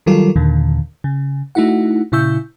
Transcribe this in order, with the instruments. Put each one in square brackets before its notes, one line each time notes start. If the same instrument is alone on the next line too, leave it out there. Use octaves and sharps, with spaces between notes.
[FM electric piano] D#3 F#3 G3 F4 A4 A#4
D#2 A#2 D3 D#3
C#3
A3 D#4 E4 F#4 F#5
A#2 C#3 E4 C#6 E6 G6